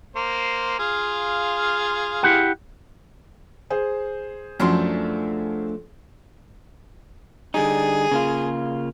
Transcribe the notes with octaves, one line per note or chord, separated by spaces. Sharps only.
A#3 C5
F4 G#4 F5
E4 G4 F#5
G#4 C5
F#2 F3 A3 D4 C6
D3 G3 D#4 G#4
C#3 A#3 F4